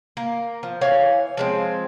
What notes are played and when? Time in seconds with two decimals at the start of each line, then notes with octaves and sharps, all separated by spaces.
0.17 A#3
0.63 F3
0.81 E3 C#5 F5 G#5
1.37 F3 G#3 C4